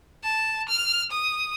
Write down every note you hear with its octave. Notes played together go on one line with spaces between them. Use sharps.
A5
F6
D#6